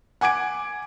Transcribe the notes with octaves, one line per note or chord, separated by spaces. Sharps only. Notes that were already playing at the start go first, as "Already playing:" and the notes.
F#5 G#5 D6 G#6 D7